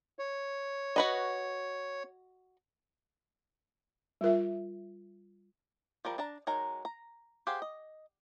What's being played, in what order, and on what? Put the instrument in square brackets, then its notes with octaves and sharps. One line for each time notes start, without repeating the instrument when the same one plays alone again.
[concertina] C#5
[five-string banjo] F#4 B4 D#5
[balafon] G3 F4 A#4 E5
[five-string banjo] F3 G3 A#4
D4 A5 A#5
F#3 G#3 D#4 A#4 A#5
A#5
G4 G#4 C5 F5 F#5
D#5